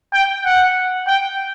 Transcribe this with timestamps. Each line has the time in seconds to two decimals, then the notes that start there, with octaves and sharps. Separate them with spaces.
0.13 G5
0.46 F#5
1.08 G5